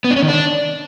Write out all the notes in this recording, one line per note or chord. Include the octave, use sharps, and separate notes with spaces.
B3
D4
C#4
D#3
D4